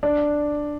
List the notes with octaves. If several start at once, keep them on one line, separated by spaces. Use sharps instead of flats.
D4